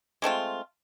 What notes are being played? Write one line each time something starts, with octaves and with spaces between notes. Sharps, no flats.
G#3 A3 C4 F4